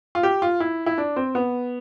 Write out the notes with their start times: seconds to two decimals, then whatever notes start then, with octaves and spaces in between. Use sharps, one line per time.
0.15 F4
0.23 G4
0.42 F4
0.60 E4
0.86 E4
0.98 D4
1.16 C4
1.35 B3